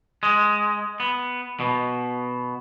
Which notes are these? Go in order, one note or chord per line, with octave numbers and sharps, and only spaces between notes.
G#3
B3
B2